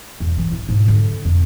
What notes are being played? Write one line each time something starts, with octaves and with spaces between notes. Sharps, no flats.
E2
E3
E4
G#2
D3
F2